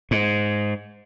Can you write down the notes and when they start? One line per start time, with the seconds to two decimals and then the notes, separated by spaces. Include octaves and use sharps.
0.11 G#2